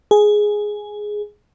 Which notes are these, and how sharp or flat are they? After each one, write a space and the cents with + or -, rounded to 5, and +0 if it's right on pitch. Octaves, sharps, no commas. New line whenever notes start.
G#4 +5